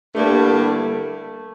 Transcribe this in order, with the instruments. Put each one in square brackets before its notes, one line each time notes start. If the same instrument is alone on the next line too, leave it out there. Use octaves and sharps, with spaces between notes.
[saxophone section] G2 D3 G3 A#3 E4 [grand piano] A3